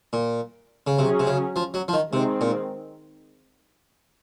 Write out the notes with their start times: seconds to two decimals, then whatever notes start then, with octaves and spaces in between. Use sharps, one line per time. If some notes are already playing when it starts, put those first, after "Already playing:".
0.13 A#2
0.87 C#3
0.98 C3 F#3 C#4 G#4
1.19 C3
1.27 C#3
1.56 F3
1.74 F#3
1.88 F3
1.93 D#3
2.12 C3 D#3 G#3 C4
2.41 A#2